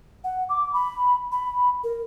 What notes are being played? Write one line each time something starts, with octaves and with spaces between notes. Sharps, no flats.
F#5
D6
B5
B5
A#4